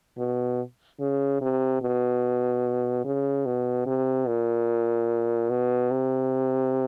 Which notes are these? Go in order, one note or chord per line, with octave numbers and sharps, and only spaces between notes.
B2
C#3
C3
B2
C#3
B2
C3
A#2
B2
C3